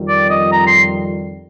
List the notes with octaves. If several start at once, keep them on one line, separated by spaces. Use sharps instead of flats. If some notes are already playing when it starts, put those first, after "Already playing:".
Already playing: F2 D#3 G3
D5
D#5
A#5
C6